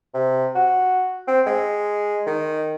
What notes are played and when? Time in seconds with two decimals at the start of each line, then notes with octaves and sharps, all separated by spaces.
0.14 C3
0.55 F#4
1.28 C4
1.47 G#3
2.26 D#3